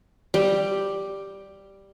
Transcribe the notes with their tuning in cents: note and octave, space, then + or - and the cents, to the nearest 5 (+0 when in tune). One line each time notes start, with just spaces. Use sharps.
G3 +0 G5 +0